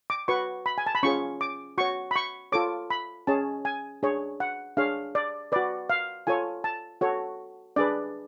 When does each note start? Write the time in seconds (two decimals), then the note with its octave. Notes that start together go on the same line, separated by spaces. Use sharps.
0.10 D6
0.28 F#4 B4 C#6
0.66 B5
0.78 G#5
0.86 A5
0.95 B5
1.03 C#4 F4 G#4 C#5 C#6
1.41 D6
1.78 F#4 C#5 C#6
2.11 B5
2.16 C#6
2.52 F4 A4 C#5 D6
2.90 B5
3.27 C#4 G#4 C#5 A5
3.65 G#5
4.03 D4 G#4 C#5
4.40 F#5
4.77 D4 G#4 C#5 F5
5.15 D5
5.52 F#4 B4 D5
5.90 F5
6.27 F4 A4 C#5 G#5
6.64 A5
7.01 F#4 A4 C#5
7.76 D4 G#4 B4 D5